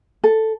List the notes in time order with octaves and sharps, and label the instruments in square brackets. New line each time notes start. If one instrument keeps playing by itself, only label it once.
[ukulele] A4